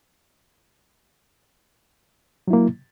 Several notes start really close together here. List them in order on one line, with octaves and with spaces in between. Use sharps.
F#3 E4 A#3